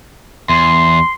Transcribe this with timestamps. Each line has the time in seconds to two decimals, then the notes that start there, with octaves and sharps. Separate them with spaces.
0.49 E2 C6